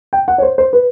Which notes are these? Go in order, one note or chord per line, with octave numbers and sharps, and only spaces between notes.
G5
F#5
C#5
C5
C5
B4